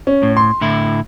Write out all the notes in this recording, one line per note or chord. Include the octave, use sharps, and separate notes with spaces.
C#4
A2
C6
A2 D3 E4